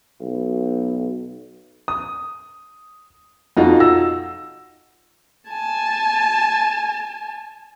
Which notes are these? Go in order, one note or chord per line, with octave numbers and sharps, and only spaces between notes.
B1
D#6
F2 D#4 F4 F#4
E6 A#6
G#5 A5